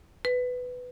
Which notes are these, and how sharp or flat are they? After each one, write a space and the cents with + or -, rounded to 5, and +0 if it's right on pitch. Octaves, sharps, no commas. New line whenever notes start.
B4 +10